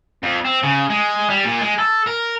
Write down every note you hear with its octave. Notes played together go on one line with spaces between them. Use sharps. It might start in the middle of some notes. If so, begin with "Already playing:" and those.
F2
C4
C#3
G#3
G3
A#2
G#3
A4
A#4